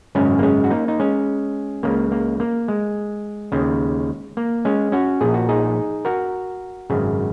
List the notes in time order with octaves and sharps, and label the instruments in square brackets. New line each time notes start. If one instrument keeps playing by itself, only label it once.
[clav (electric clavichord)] G#1 F#2 C#3 G#3 C#4
A#3
G#3 C#4
F#4
A#3 D#4
D#4
G#3 C#4
C#2 C#3 A#3
A#3
A#3
G#3
D#2 C#3
A#3
G#3 C#4
C#4 F#4
A#1 A#2 G#4
F#4
D#4 G#4
F#4 A#4
G#1 F#2 C#3